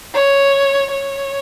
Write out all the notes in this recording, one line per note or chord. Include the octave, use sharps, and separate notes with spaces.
C#5
C#5